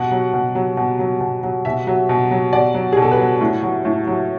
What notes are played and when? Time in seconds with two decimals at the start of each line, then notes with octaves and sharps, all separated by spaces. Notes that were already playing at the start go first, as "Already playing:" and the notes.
Already playing: B2 F#5
0.11 F#3
0.33 B2
0.55 F#3
0.77 B2
0.99 F#3
1.21 B2
1.43 F#3
1.65 B2 E5
1.87 F#3
2.09 B2
2.31 F#3
2.53 B2 D5
2.74 F#3
2.92 B2 G#4
3.02 A4
3.11 B4
3.19 F#3
3.41 A2
3.63 F#3
3.85 A2
4.07 F#3